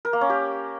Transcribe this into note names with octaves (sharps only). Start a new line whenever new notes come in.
A#4
A#3
C#4
G4